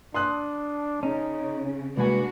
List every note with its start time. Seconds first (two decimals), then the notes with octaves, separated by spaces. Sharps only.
0.14 D4 C6 D#6 F#6
1.03 C#3 C#4 D#4
1.97 C2 G#3 A#3 D4 F#4 B4 G#5